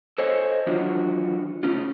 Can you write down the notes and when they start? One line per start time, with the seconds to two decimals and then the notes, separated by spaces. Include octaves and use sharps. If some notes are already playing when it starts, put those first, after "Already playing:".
0.18 A4 C5 C#5 D#5 F5 G#5
0.67 D#3 E3 F#3 D4 F4 F#4
1.63 A2 C#3 C#4 F4